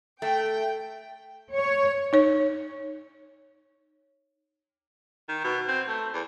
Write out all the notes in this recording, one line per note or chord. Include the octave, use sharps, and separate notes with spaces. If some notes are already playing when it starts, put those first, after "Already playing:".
A3 G5
C#5
D#4 C#5
D#3
B2
C4
A3
E2